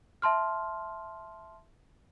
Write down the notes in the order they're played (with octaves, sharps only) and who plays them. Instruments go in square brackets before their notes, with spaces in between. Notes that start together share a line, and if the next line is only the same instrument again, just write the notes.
[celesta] E5 A5 C6 F6